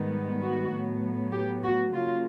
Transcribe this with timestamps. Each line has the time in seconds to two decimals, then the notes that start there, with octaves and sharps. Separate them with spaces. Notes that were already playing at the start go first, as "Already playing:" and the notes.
Already playing: G#2 D#3 G3 B3
0.42 F#4
0.72 A2 F#3 B3
1.32 G4
1.62 F#4
1.92 C#3 F#3 A#3 F4